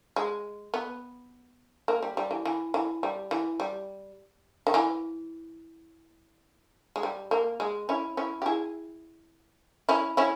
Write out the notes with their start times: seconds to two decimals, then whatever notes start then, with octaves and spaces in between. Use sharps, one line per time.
0.16 G#3
0.74 B3
1.88 A#3
2.03 G3
2.17 G3
2.31 E3
2.45 E3
2.74 E3
3.03 G3
3.31 E3
3.60 G3
4.67 D#3
4.74 E3
6.96 G#3
7.03 G3
7.31 A#3
7.60 G#3
7.89 C#4 E4
8.17 C#4 E4
8.42 G4
8.46 E4 G#4
9.89 C#4 E4
10.17 C#4 E4